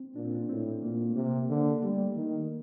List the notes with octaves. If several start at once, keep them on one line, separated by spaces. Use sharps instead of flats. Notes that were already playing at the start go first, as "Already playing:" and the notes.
Already playing: C4
A#2 D4
C4
D4
A2 C4
A#2 A#3
A3
C3 A#3
D3 A#3
G3 A3
D#3